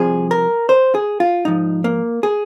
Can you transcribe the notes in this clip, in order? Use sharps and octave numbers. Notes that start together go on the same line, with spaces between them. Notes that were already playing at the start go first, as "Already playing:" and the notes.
Already playing: C2 C3 F3 G#4
A#4
C5
G#4
F4
G#2 F3 D#4
A#3
G#4